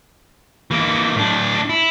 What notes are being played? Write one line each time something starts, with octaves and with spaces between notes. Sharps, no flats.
E3 A#3
A2 D4
E4